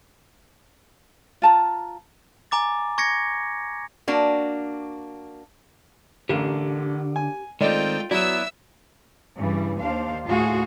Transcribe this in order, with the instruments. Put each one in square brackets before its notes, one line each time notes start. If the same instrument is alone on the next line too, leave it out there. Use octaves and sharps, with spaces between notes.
[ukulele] F4 A5 A#5
[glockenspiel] G#5 A#5 D6 A6
C#6 G#6 A#6 C#7
[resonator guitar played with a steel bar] A#3 D4 F#4
[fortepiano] A1 [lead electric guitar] D3 [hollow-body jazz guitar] G4 A#4 F5
[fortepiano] G#5
[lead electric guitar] D#3 C4 [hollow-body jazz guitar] G#3 [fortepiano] A3 D5 D#5 [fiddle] F4 G5
[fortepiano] F#3 [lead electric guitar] B3 E4 [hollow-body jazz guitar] D5 [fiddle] E5 E6
[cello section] G2 C#3 E3 G3
D#2 D4 C5 F5
D2 A2 F4 F#4 G#4 F5